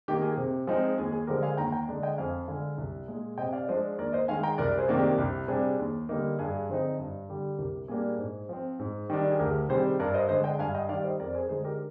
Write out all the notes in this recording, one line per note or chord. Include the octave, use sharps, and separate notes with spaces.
D#3 A#3 G4
G#4
C3
F3 G#3 C4 D#4 G#4
D#2 G#4
G#4
D3 F3 G#3 G4 A#4
F5 G#5
D#2 G5 A#5
G5 A#5
D3 G#3 D4
D#5 G5
F2 F5 G#5
D3 G#3 F5 G#5
C2
A#2 G#3
C3 D#5 G5
D5 F5
F3 G#3 D4 C5 D#5
D#2 A#4 D5
C5 D#5
D#3 G#3 F5 G#5
G5 A#5
C2 A#4 D5
G#4 C5
C3 D#3 A#3 D4
G4 A#4
C2 G4
C3 G3 D4 G#4
D#2
D3 G3 A#3 D#4
G2 G#4
D3 F3 C4 D#4
G2
D3 G3 D4
C2 G4 A#4
A#2 G3 A#3 D4 G#4
G#2
F3 C4
G#2
D#3 G3 D4
G#4
D2 G4 A#4
C3 D#3 G3 G#4 C5
G2 A#4 D5
C5 D#5
D3 G#3 D4 C5 D#5
D#5 G5
G2 F5 G#5
D#5 G5
D#3 G3 D5 F5
C5 D#5
F2 A#4 D5
G#4 C5
D3 G#3 D#4 G#4 C5
G4 A#4